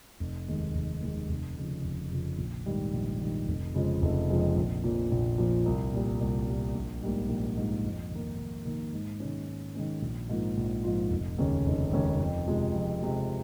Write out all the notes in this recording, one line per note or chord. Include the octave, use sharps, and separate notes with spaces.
F1
D#2 D#3 G#3
F1
D#2 D#3 G#3
F1
F2 C#3 F3
F1
F2 C#3 F3
A#1
G#2 D#3 G3
A#1
G#2 D#3 G3
F1
F2 C#3 F3 G#3
F1
F2 C#3 F3 G#3
A#1
A#2 F3
A#1
A#2 F3
C2
A#2 G3
C2
A#2 G3
A#1
G#2 G3 A#3
A#1
G#2 G3 A#3
F2
D#3 A#3
F2
D#3 A#3
G#2
D#3 G#3 C#4
G#2
D#3 G#3 C#4
A#1
G#2 F3 A#3 F4
A#1
G#2 F3 A#3 F4
F1
D#2 C#3 G#3 C#4
F1
D#2 C#3 G#3 C#4
F2
C3 F3 G#3
F2
C3 F3 G#3